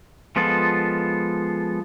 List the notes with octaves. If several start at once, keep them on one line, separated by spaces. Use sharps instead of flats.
F3 G#3 B3 F4 A4